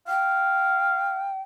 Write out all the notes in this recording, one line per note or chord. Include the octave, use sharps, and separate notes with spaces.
F5 G5